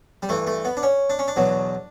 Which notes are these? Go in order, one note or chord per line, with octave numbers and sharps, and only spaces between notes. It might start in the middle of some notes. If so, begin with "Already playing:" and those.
G3
G2 E3 A3
A3
B3
D4
C#4
D4
C#4
D4
E2 B2 F#3